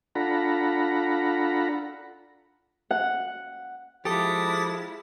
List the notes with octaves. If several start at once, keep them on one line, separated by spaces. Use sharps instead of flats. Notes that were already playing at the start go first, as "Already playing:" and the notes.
D4 F4 A4 F#5 A#5 B5
F#5
F3 G#3 E4 G4 A4 D6 D#6 A6